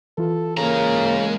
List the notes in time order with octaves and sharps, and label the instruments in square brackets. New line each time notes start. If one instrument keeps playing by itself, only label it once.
[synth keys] E3 F4 [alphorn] A4
[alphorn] C#3 [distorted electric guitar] G#3 A#5 [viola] A#3